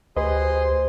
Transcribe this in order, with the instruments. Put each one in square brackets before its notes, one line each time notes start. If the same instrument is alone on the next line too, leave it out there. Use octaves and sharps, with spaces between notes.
[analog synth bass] D2 [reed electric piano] G4 B4 D#5 [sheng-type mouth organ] G#4 C6 [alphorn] C5